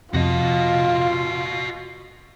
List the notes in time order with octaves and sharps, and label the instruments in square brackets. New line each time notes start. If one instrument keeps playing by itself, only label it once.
[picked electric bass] F2 C3 [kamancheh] F4 [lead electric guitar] F#4 D#5